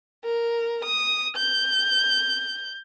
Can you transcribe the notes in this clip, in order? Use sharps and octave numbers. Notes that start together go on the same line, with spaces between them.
A#4
D#6
G6